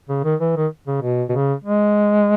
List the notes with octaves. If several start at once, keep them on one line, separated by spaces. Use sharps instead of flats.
C#3
D#3
E3
D#3
C#3
B2
B2
C#3
G#3